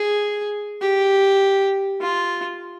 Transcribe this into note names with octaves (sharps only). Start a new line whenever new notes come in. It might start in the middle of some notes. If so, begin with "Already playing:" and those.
Already playing: G#4
G4
F4